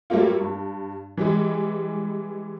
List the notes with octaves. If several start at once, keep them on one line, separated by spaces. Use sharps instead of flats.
F#3 G3 A3 A#3 F4
G2
E3 G3 G#3